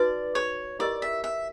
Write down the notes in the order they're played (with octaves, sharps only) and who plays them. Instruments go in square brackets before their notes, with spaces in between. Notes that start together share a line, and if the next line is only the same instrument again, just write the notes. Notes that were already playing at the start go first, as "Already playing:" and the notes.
Already playing: [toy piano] D#4 F#4 B4 [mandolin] D5
[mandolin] C#5
[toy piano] E4 G4 A#4 D#5 [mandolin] D5
[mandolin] E5
E5